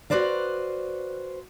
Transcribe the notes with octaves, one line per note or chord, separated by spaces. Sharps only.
F#4 A4 B4 C5 D5 F5